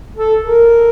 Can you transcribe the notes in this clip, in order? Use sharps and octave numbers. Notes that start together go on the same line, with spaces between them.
A4
A#4